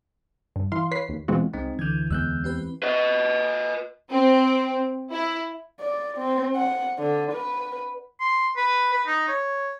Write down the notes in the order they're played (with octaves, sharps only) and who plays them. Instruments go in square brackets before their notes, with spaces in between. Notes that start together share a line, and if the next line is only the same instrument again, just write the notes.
[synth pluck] G2
E3 E4 F5 C6
B4 C#5 B6 C7
D#2
B2 E3 G#3 C4 F4 F#4
[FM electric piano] C2 [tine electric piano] G#3 C4 D#4
[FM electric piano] D2 D3 [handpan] E3 [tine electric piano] G6 G#6
[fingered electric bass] E2 G#3 B3 [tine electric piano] E6 F#6 G6
[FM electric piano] C4 G4 B4
[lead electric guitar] B4 D#5
[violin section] C4
E4
[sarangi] D5
C4
F#5
D3
B4
[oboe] C6
B4
B4
D#4
C#5